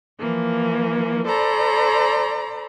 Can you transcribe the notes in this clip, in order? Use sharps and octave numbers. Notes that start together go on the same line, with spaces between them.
E3 F3 A#3
A4 C5 D5 A#5 B5